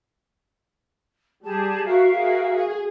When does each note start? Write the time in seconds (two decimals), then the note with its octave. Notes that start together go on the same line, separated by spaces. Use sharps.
1.44 G3 G4 G#4 A5
1.85 F#4 A#4 E5 F5
2.16 F#4 G#4
2.54 G#4